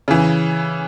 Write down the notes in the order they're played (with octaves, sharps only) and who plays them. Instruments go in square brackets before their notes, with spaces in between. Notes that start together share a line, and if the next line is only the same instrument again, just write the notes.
[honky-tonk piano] C#3 E3